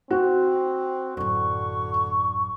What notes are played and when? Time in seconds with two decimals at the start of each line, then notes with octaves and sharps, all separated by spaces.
0.10 C4 F#4
1.17 A1 F#2 D3 C#6